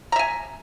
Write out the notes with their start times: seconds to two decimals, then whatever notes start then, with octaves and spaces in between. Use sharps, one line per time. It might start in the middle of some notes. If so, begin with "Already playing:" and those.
0.12 A#5
0.16 E5
0.19 G#5